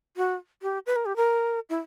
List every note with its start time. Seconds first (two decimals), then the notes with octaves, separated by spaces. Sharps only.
0.17 F#4
0.62 G4
0.86 B4
0.96 A#4
1.06 G4
1.16 A#4
1.70 E4